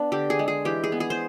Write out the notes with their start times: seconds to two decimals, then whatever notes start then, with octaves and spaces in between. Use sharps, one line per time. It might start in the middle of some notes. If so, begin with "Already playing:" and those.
Already playing: B3 D4
0.12 D3 G4
0.30 G#4
0.39 G#3
0.48 G#4
0.65 E3 G4
0.84 G#4
0.92 B3
1.00 G#4
1.10 C5